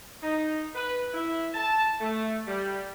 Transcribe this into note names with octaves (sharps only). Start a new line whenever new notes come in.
D#4
B4
E4
A5
A3
G3